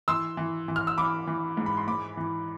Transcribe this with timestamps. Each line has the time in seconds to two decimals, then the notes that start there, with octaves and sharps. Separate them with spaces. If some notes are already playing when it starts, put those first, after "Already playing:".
0.08 E3 C6 E6
0.37 E3
0.68 E3
0.76 F6
0.87 E6
0.98 E3 B5 D6
1.27 E3
1.57 G#2
1.66 B5
1.77 C6
1.88 G#2 B5 D6
2.17 E3